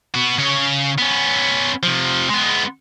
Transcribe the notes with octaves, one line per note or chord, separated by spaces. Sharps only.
B3 F#4
C#3 C#5
B3 C#4
C3 F3
G#3 B3